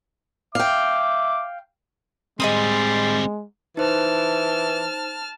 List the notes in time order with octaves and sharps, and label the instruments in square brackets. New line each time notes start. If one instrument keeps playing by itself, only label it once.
[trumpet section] E5 D6 [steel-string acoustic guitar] F5 G5
[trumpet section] G3 C6 [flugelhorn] G#3 [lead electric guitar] C4 G#4 [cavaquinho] D#5 B5 D#6
[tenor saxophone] E3 [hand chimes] D#4 C5 [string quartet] A5 F6